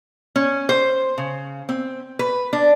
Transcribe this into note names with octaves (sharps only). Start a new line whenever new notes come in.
C#4
C5
C#3
C4
B4
D4